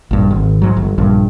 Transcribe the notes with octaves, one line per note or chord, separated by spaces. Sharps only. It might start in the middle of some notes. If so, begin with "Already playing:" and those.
A#1 G2
G#1
G#2 F#3
G1
A#1 G2